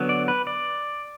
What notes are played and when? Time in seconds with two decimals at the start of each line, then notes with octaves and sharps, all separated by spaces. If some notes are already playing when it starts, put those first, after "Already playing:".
Already playing: D3 F#3 B3
0.09 D5
0.28 B4
0.47 D5